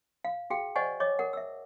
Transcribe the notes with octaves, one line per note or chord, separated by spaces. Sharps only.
F5
F#4 G#4 F5 G5
C5 D5 D#5 F#5 G#5 C#6
C#5 D#5 D6
A#4 F#5
E5 E6